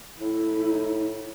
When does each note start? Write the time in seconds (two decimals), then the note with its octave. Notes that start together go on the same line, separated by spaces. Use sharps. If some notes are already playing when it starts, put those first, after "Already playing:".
0.21 A2 E4